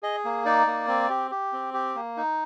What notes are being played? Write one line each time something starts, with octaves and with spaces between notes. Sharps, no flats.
G#4 D#5
A#3
D#4 D5
A#3
C4
G4
G4
C4
G4
A#3
D#4